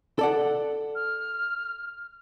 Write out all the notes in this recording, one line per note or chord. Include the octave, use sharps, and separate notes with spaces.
A4 D5 F#5
F6